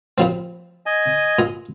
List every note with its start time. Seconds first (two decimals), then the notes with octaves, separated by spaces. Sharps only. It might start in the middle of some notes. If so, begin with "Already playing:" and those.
0.18 A#2 F3 C4
0.86 D#5 G#5
1.39 A#2